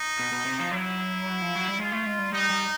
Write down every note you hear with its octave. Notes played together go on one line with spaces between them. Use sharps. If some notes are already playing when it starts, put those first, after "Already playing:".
Already playing: D#4
B2
B2
C3
F3
F#3 E4
F3
F#3
G3
G#3 F4
A3
G#3
G3
G3 D#4
G3